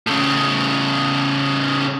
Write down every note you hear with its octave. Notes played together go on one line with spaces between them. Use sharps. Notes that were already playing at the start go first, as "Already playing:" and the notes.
A2 C#3